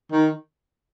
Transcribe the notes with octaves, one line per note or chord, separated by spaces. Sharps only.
D#3